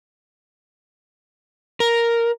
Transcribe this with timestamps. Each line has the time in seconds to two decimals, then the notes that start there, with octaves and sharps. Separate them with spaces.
1.80 A#4